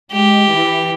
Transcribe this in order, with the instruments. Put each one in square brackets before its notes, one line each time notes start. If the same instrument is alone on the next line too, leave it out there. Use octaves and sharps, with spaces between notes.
[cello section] G#3 [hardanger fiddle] G4
[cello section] E3